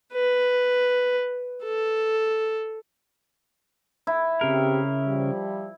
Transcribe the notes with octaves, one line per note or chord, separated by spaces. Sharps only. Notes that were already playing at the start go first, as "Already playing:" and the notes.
B4
A4
E4
C#3 C4 G4 A#4
F3 G3